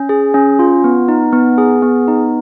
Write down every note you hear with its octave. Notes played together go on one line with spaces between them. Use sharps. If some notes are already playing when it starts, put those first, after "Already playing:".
Already playing: C#4
G#4
C#4
F4
B3
D#4
B3
G#4
B3
D#4